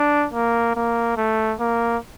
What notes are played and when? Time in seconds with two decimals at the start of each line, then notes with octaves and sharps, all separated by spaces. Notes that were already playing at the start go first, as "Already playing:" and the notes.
Already playing: D4
0.34 A#3
0.76 A#3
1.17 A3
1.60 A#3